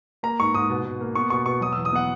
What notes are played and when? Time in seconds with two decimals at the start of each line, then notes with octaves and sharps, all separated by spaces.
0.23 A#3 A#5
0.40 G#2 C#6
0.54 G#2 D#6
0.70 B2
0.85 B2
1.01 A#3
1.15 B3 C#6
1.30 B2 C#6
1.46 B2 C#6
1.61 F#3 D#6
1.73 E6
1.77 E2
1.85 D#6
1.93 B3 F#5